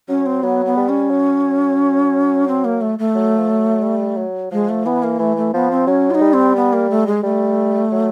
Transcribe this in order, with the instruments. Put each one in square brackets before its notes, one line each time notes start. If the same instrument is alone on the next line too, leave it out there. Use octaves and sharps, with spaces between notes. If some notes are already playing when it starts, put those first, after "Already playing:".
[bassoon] F#3 [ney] C#4
[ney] C4
[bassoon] F#3 [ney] B3
[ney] B3
[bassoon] G3
[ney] C#4
[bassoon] F#3
[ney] C4
A#3
A3
A3
[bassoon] F#3
F3
F#3
G3
F#3
[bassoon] F3 [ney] G#3
[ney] A3
[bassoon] E3 [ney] B3
[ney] A#3
[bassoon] E3 [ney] A3
[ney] A3
[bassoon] F3 [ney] B3
[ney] C4
[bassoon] F#3 [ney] C#4
[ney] F4
D#4
[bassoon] G3
[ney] C4
B3
A#3
A3
G#3
[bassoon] G3 [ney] A3
[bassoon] F#3